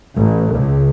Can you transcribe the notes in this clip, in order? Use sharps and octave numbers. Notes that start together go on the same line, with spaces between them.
A1
C#2